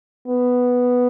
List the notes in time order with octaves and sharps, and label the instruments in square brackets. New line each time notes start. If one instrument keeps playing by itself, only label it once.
[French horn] B3